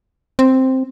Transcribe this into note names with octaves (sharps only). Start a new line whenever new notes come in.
C4